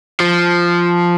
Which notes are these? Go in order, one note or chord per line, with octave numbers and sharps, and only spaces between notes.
F3